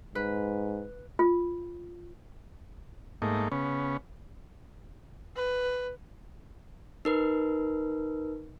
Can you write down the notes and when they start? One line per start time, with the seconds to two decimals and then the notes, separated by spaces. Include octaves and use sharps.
0.15 G#2 B4
1.19 F4
3.22 G#2 A3 A#3 D#4
3.52 C#3 B3 C#4
5.36 B4
7.05 D#4 A#4 B4